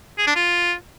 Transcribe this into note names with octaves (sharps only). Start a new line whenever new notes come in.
G#4
D4
F4